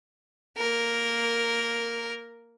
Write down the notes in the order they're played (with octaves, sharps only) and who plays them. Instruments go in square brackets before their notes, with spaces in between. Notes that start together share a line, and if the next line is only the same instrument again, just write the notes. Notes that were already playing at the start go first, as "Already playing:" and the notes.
[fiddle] A#3 A#4